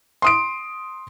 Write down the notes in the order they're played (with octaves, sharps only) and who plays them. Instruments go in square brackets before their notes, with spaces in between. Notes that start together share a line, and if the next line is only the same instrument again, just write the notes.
[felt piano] C6 D#6 D7